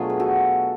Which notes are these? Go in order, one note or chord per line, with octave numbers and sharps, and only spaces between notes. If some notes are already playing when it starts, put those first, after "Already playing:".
Already playing: B2 F#3 A3 D4 F4 G#4
B4
F#4 A4